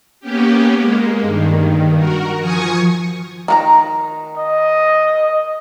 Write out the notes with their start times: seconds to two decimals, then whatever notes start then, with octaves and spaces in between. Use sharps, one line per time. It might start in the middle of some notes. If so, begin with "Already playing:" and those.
0.20 A#3 B3 C#4 G4
0.78 G#3 A#3
1.21 G2 D#3
1.95 F#4 A#4
2.39 F3 G#5 C#6 D#6
3.48 D#3 F#4 A#5
4.38 D#5